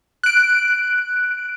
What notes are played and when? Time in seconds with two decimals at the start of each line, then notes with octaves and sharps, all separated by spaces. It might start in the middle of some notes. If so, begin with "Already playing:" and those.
0.23 F#6 D7